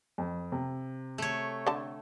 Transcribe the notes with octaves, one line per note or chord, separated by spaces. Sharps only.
F2
C3
A3 C#5
D3 A5